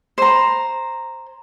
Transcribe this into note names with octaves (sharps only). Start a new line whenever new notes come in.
C5 A#5